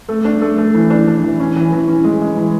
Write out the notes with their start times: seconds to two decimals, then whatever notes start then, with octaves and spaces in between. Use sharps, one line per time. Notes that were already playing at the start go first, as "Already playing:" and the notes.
0.09 A3
0.25 D4
0.42 A3
0.58 A3
0.75 E3
0.90 D4
1.07 D4
1.23 E3
1.39 C#4
1.56 E3
1.72 E3
1.88 C#4
2.04 G#3
2.21 G#3
2.37 E3